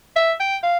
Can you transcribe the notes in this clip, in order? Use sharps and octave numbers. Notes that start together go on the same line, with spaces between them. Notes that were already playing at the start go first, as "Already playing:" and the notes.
E5
G5
F5